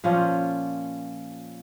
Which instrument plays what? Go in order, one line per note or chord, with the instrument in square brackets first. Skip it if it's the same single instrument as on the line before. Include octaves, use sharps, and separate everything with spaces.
[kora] A#2 F3 C#4 F4